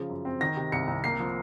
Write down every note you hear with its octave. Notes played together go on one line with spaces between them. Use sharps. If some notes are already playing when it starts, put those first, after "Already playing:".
Already playing: C#3 F3
F#2
C4
D#3 A#6
C3
C2 C#7
C2
A#3 C7
F3